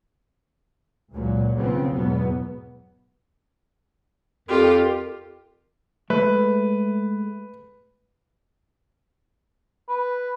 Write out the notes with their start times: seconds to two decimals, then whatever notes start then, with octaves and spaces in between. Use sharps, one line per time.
1.13 C#2 A#2 F#3
1.57 B1 C#3 F3 B3 C4
1.93 E2 G#2 B2 F#3 B3
4.48 F2 F4 G4 A#4
6.10 G#3 A3 B4 E5
9.89 B4